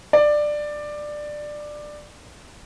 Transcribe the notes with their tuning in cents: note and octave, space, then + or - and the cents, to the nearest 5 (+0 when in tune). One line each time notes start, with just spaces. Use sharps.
D5 +15